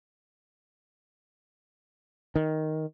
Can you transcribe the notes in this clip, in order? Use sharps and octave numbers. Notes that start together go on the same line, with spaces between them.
D#3